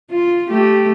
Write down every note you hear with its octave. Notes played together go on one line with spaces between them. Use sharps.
F4
A3 G4